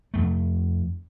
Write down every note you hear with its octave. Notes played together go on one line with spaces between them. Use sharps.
F2 A3